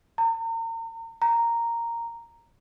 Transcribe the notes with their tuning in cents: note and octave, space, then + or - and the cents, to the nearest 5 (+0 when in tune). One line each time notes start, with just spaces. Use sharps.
A#5 -35
A#5 -5